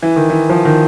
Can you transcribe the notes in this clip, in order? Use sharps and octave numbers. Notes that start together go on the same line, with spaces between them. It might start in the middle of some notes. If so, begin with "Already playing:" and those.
E3
D#3
E3
F3
D#3